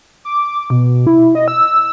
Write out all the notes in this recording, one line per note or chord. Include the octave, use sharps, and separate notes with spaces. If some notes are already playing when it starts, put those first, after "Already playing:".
D6
B2
E4
D#5
E6